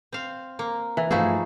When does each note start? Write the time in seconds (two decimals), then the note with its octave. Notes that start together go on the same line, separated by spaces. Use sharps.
0.12 C4 F5
0.59 A#3
0.97 E3
1.11 G2 F3 A3 D#4 E4 F#4 G#4